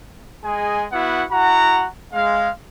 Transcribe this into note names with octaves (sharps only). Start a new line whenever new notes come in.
G#3 G#4 D#5 G#5
B3 E4 F#4 F#5
E4 F#4 F#5 A#5
G#3 F5